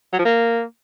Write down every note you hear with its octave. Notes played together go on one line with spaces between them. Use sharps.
F#3
F3
A#3